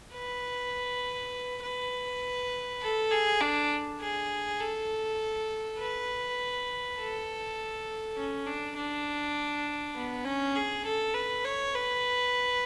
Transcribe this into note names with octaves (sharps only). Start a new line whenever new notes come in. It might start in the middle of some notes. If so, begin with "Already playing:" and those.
B4
B4
A4
G#4
D4
G#4
A4
B4
A4
C#4
D4
D4
B3
C#4
G#4
A4
B4
C#5
B4